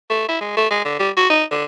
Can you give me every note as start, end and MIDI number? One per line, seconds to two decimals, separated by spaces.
0.10 0.25 57
0.28 0.37 64
0.41 0.53 56
0.57 0.67 57
0.70 0.80 56
0.85 0.94 50
0.99 1.10 55
1.17 1.29 66
1.30 1.43 63
1.51 1.64 50